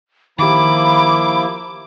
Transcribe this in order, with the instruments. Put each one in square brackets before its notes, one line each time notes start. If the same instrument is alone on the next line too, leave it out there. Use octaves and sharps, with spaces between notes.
[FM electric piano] D#3 G4 [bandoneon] F3 A#3 E4 [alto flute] B5 [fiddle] D6